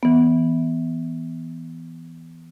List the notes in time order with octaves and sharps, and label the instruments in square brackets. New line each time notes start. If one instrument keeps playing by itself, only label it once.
[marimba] E3 B3